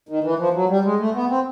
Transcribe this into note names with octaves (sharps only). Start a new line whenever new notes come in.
D#3
E3
F3
F#3
G3
G#3
A3
B3
C4